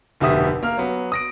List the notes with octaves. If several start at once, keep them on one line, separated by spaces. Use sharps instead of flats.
F1 D2 B2 G4 E5 D#6
A#3 F6
F#3 B3
D#6 A#6 D7